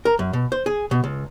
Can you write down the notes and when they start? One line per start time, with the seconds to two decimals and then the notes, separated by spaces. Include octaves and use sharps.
0.05 A#4
0.19 F#2
0.33 B2
0.52 C5
0.66 G#4
0.91 B2
1.04 C#2